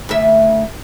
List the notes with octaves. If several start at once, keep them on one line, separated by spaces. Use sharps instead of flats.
D2 E5